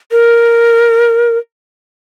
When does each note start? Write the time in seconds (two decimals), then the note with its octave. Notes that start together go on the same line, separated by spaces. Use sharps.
0.12 A#4